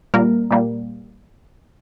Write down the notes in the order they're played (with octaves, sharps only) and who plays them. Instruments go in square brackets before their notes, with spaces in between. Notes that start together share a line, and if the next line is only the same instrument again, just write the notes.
[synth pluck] A#2 G3 A#3 A#4
A#2 G3 A#3